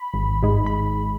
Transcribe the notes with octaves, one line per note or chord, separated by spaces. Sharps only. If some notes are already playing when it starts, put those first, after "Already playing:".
Already playing: B5
G#1
G#2 G#3
B5